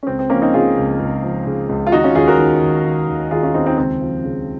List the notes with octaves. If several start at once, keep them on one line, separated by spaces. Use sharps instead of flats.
C#4
C#2 C4
C4
F3 A#3 C#4
C4 D#4
C#3 F4 G#4
C#2
C#2
F3
C#3
C#2
F4
D#3 D#4 F#4
C#4 F4
D#2 F4 G#4
F#4 A#4
D#3
D#2
D#3
D#2
D#3 F4 G#4
C#4 F4
D#2 C4 D#4
C4 D#4
C#2 C4
F3
C#3